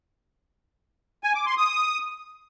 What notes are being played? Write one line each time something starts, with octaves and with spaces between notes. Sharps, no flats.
G#5
D6
C6
D#6